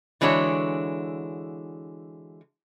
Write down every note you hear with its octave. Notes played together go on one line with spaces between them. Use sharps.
D3 E3 G#3 D4 F#4 C#5